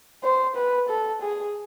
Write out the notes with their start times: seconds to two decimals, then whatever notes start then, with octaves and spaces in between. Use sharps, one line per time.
0.24 C5
0.56 B4
0.89 A4
1.22 G#4